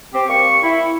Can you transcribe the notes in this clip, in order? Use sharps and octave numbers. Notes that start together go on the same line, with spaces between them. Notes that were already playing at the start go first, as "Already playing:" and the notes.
C4 G4
G3 A#3 C4 C#6
E4